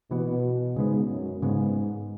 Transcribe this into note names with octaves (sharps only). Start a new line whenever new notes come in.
B2 E3 B3
G#2 C#3 G#3 B3
F#2
G#2 C#3 G#3 B3